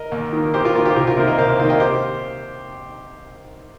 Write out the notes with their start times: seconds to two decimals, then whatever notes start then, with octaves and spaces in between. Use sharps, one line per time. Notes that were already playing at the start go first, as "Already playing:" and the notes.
Already playing: A#4 D#5
0.12 D#2
0.33 D#3 A#3
0.54 D#2 G4 C5
0.65 F4 A#4
0.75 D#3 A#3 F4
0.85 G4
0.91 C5
0.96 C2 F4 A#4
1.07 F4 A#4
1.17 C3 D#3 A#3 C5
1.27 A#4 D#5
1.38 C2 C5 F5
1.49 C5 F5
1.59 C3 D#3 A#3 C5 F5
1.69 D#5 G5
1.80 G4 C5